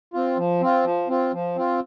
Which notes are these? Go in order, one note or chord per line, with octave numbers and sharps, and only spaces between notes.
C4 F4
F3
C4 F4
F3
C4 F4
F3
C4 F4